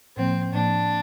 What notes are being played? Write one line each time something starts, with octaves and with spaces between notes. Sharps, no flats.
A2 F3 A#3 C4
A2 F3 A#3 D4